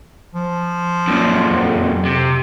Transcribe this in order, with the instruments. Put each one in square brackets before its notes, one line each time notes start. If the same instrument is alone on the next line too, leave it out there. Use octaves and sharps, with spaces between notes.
[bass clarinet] F3
[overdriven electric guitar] F#2 A#2
[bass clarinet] F2
[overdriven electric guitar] C3